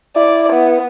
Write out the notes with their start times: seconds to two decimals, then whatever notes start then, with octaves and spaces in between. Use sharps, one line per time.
0.16 E4 D5
0.53 B3